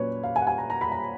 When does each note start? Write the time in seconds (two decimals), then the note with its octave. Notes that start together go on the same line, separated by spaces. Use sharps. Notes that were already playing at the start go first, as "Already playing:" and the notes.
Already playing: A#2 F#3 C#4 B4 C#5
0.23 F5
0.36 G#5
0.42 F#5
0.47 G#5
0.58 A#5
0.70 A#5
0.81 B5
0.92 A#5